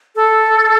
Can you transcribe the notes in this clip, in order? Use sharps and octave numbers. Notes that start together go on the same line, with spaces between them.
A4